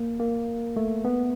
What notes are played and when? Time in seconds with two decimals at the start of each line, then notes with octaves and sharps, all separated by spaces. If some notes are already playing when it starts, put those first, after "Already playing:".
Already playing: A#3
0.20 A#3
0.77 A3
1.05 B3